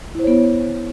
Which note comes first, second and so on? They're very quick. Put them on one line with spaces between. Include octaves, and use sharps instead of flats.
E4 C5 C#5 B3